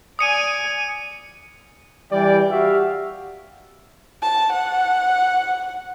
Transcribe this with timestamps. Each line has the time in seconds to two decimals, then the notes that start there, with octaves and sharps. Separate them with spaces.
0.19 D5 G#5 D#6 C#7 D#7
2.12 E3 G3 D5 G5
2.51 F#4 G4 E5 F5
4.22 A5
4.52 F#5